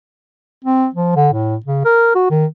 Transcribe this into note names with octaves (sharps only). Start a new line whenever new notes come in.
C4
F3
D3
A2
C#3
A#4
F#4
D#3